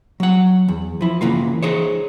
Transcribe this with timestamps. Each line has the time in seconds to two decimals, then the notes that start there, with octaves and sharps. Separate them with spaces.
0.20 F#3 F#5
0.68 E2
1.01 F3 E4
1.21 C#3 E3 A#3 F4
1.63 D#4 G#4 C5 C#5